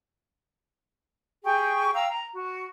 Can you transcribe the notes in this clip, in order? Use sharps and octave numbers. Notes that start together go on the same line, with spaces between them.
G4 G#4 G5 C#6
F5 G5 A#5 E6
A#5
F#4